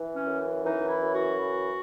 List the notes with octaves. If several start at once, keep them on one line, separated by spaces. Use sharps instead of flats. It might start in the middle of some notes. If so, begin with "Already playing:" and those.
Already playing: E3
C#4
F#2
E3 D#4
E4
F#2
F#4
E3